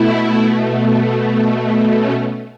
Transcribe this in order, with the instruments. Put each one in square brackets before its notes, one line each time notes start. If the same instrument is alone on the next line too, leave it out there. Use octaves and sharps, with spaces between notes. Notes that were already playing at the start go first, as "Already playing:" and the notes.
Already playing: [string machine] B2 A3 E4
C#4